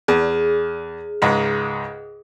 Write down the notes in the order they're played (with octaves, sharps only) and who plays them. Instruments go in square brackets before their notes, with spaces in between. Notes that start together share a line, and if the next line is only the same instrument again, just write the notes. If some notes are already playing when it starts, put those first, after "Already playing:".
[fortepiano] E2 [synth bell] G#4
[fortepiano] C#2 G#2